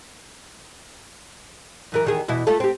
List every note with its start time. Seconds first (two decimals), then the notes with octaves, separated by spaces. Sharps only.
1.92 F#2 E3 A#4
2.05 E2 D#3 G#4
2.28 E2 B2 E4
2.47 A3 F4 A4
2.60 C4 G4